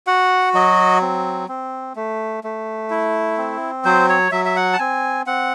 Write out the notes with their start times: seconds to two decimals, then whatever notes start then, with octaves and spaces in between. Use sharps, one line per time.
0.07 F#4 F#5
0.54 F#3 D#5
1.02 C4
1.48 C4
1.96 A3
2.44 A3
2.90 E4
3.38 C4
3.85 F#3 C5
4.09 C#5
4.32 F#3 E5
4.45 E5
4.56 F#5
4.73 A5
4.79 C4 G#5
5.27 C4 F#5